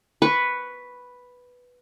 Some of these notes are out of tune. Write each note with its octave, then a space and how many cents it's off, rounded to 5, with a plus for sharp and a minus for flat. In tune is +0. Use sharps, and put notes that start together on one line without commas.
B4 +0 C#6 +0